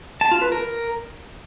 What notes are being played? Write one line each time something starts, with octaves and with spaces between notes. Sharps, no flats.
A5
F4
B4
A#4